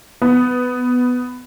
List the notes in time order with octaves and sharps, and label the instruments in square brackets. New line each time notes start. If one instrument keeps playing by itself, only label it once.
[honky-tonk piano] B3